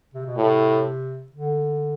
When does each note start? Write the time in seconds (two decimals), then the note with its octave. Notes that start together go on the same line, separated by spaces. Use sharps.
0.14 C3
0.26 B2
0.37 A2 C3
1.32 D3